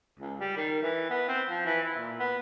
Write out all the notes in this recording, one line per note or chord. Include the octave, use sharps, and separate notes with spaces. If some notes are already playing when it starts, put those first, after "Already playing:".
C#2
G3
D#3
E3
B3
C4
F3
E3
E4
A#2
B3